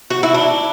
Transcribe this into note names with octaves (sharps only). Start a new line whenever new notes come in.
F#4
E4
D4